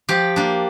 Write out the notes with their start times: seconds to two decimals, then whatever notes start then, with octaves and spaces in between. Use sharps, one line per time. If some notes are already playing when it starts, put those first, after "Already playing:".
0.09 F3 G4
0.36 A#3 D4